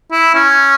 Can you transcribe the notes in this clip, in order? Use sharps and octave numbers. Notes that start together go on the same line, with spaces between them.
E4
C#4